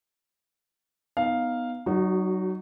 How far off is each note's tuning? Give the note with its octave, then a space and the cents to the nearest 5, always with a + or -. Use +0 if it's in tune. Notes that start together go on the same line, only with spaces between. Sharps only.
B3 +5 D#4 +0 F5 +0
F#3 +30 D#4 -20 F#4 +0